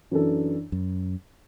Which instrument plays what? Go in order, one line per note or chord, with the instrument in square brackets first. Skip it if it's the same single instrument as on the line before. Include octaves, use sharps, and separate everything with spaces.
[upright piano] F#2 E3 D4 A4
[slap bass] F#2